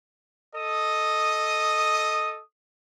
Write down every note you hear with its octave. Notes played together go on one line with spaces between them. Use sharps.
A4 D#5 D#6